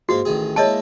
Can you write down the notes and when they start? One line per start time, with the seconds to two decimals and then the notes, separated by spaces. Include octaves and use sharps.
0.09 G#2 A#3 F#4
0.25 A1 D#3 G#4
0.56 G#3 A#3 E4 C#5 D#5 A5